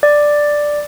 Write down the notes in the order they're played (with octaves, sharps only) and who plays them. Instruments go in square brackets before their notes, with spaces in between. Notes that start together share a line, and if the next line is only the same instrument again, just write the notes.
[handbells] D5